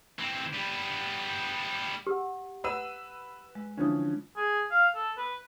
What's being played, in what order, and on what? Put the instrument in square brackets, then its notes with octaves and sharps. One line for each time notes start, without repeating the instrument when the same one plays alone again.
[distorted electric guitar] E3 C4
G3 B3
[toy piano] G4 [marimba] F#5 E6 F6
[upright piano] B4 E6 D#7 [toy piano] F#5 [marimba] A#5
[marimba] G#3
[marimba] D3 D#6 [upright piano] E3 F3 C#4 [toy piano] D4
[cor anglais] G#4
F5
A4
B4